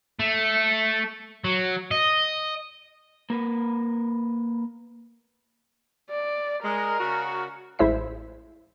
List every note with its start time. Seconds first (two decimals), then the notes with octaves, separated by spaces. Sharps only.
0.19 A3
1.44 F#3
1.91 D#5
3.30 A#3 A#4 B4
6.11 D5
6.64 G#3 A#4
6.99 C#3 F#4
7.79 A1 G#3 E4 C5 E5 B6